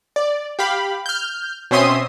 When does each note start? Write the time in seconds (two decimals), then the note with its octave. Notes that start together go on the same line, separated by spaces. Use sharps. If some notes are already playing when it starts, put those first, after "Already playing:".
0.16 D5
0.59 G4 F5 B5
1.06 F6 G6
1.71 B2 C4 C#4 E5 C6 D#6